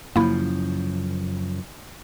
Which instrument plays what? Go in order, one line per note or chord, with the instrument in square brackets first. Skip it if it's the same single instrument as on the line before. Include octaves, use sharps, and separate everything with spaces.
[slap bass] F#2 C#3 F3 [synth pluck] A#3 E4